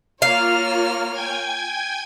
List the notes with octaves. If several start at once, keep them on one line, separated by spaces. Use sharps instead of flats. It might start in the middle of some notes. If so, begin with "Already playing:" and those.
A#3 F4 C#5 F5 F6
G5 G#5 G#6